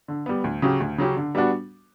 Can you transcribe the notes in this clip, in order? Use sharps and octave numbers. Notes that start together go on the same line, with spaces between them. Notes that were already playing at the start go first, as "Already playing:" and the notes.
D3
G3 B3
D2
C#3 F#3 C#4 G4
D2
C#3 F#3 C#4 G4
D3
G3 B3 D4 F#4